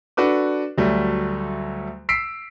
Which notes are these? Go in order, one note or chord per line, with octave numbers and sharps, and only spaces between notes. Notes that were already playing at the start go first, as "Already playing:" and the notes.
D4 F#4 A4 B4 D6
D2 F#3 G3 A3
E6 B6 C7 D7